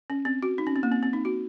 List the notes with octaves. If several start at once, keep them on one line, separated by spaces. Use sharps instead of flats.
C#4
C4
F#4
D#4
C#4
C4
A#3
C4
C4
D#4
F#4